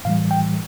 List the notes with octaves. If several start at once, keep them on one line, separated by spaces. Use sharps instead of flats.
A2 E3 G3 F5
G5